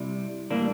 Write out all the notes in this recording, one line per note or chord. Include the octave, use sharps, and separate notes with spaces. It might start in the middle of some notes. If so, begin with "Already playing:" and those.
Already playing: C3 G3 E4
A2 E3 G3 A#3 D4